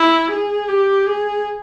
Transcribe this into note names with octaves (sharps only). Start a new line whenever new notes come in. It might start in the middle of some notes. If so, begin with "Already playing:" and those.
Already playing: E4
G#4
G4
G#4